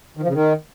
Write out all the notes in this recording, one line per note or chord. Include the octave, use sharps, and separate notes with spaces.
D#3
F3
C#3
D#3